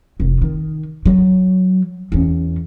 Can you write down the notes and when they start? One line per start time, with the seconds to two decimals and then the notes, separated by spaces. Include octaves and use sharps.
0.20 F1
0.42 D#3
1.06 F#3
2.12 E2 C#4